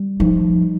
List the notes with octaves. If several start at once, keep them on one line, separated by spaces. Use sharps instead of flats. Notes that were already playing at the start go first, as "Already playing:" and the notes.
Already playing: G3
F3 D#4